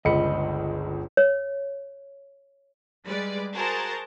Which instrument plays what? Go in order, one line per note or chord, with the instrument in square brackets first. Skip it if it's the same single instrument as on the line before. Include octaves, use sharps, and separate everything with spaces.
[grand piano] G1 C#2 C#7 [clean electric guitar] D#5 B5
[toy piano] C#5
[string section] G3 G#3 B4 D5
F#4 G#4 A#4 C5 A5 A#5